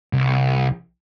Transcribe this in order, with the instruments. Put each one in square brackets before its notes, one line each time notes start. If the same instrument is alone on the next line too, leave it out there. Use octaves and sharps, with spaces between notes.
[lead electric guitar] C2